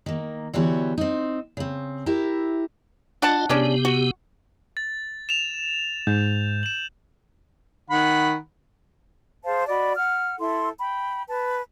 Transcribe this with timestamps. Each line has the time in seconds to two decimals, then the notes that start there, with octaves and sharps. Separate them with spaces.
0.06 D#3 A#3
0.53 D3 E3 B3 F#4 G4 C#5
0.98 C4 D#4
1.57 C#3 C4
2.06 E4 G4 A#4 E5
3.22 D4 F4 D#5 F#5 A5
3.49 C3 G#3 B3 C#4 D4 G4
3.85 F#4
4.77 A6
5.29 E7 F7
6.07 G#2 G6
6.63 E7 F#7
7.90 D#3 F#5 B5
9.45 G#4 C5 F5 A5
9.68 F#4 D5 D#5 B5
9.96 F#5 F6
10.38 E4 A4 C6
10.78 G5 B5
11.29 B4 A5